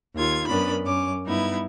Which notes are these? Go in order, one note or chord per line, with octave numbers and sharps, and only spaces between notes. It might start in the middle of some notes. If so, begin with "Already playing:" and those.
D#2 F4 G#6
F#2 B3 C#4 D4 A#4 B5
F#2 C#4 D6
G2 B3 D#4 E4 G#6